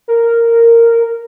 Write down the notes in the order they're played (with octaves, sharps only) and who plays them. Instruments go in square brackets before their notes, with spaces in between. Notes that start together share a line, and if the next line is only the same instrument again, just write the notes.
[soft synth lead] A#4